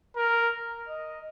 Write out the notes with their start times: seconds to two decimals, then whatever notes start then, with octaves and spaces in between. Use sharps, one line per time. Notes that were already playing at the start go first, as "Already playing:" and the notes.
0.16 A#4
0.89 D#5